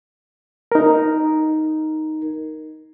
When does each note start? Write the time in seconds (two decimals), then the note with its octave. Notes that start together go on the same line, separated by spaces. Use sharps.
0.72 D#4 A#4